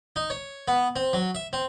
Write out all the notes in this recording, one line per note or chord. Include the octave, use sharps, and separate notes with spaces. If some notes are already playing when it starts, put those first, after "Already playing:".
D#4
C#5
B3
C4
F#3
E5
C4